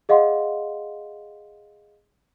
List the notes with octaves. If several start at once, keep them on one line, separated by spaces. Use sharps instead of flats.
G#4 D#5 F5 F#5 C6